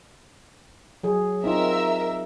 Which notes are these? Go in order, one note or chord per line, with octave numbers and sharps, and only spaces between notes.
F#3 G#4
C4 D#4 F4 A#4 E5 E6